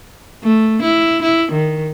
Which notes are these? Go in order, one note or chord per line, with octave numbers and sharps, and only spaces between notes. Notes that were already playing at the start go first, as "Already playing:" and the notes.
A3
E4
E4
D#3